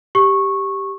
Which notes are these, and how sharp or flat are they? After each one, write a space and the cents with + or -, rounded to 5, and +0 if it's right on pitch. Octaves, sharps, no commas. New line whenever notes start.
G4 +0 C#6 -15